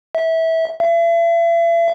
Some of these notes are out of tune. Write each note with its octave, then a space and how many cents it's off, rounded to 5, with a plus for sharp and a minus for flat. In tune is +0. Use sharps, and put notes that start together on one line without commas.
E5 -20
E5 +40